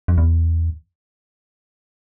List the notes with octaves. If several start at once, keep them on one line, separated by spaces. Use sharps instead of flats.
F2
E2